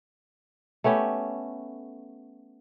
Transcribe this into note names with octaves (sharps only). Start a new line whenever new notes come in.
A3 B3 C#4 G4